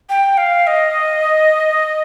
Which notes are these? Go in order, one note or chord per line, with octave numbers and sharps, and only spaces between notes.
G5
F5
D#5